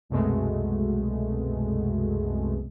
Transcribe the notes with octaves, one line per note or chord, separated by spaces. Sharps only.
C2 F#2 B2 G#3 A3